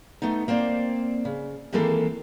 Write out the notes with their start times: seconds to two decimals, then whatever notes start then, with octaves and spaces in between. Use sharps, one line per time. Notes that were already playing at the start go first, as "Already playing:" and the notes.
0.22 A3 B3 D#4
0.48 A#3 C4 C5 D5
1.25 C#3
1.73 D#3 E3 G#3 A#3 C4 A4